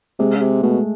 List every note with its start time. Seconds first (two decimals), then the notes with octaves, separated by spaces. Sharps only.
0.19 C3 G#3
0.35 C#3
0.40 C3
0.62 B2 A3